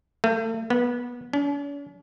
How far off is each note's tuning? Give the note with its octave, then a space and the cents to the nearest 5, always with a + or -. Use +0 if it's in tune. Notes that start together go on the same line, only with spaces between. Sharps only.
A3 +40
B3 -25
C#4 +45